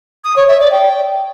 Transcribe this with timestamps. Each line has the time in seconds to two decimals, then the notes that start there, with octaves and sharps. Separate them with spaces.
0.24 D#6
0.36 C#5
0.48 E5
0.60 D5
0.72 G5